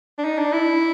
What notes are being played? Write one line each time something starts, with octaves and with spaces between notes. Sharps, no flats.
D4
D#4
D4
E4